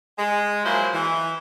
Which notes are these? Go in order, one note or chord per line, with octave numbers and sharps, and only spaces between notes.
G#3
F3 F#3 A#3 E4 G#4 C5
E3